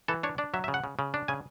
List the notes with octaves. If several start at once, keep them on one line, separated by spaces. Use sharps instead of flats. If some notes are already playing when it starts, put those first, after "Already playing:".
E3 A4
D4 C#5
D4 D5
F#3 E5
E5
C#3
F#5
C#3
C#3
D4
C#3 G#5